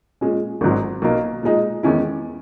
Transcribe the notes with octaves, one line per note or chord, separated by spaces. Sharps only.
A#2 G#3 C#4
G#1 G#2 F#3
B1 B2 A#3 D#4
A#2 G#3 D#4
E2 D#3 G#3 C#4 E4